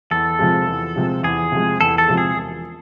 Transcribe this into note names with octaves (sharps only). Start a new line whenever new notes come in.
E2 A4
C3 F3 G#3
E2
C3 F3 G#3
E2 G#4
C3 F3 G#3
E2 A4
A4
C3 F3 G#3
G#4
E1